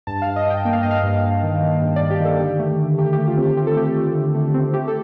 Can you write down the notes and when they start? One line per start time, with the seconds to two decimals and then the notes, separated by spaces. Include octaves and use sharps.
0.07 G2 A5
0.22 G2 F5
0.36 D#5
0.46 G2 G5
0.65 A#3 G5
0.73 F5
0.83 G2 D#5
0.91 F5
1.03 G2
1.24 G2
1.43 D#3
1.62 D#3
1.82 G2
1.96 G2 D5
2.10 G4
2.20 D#3 A4
2.39 D3 G4
2.59 A3
2.78 D3
2.98 A3 G4
3.13 G4
3.19 A3
3.27 F4
3.37 C4 G4
3.57 C4 G4
3.67 A4
3.76 A3 G4
3.96 A3
4.15 D3
4.34 A3
4.54 C4
4.73 A3 G4
4.88 A4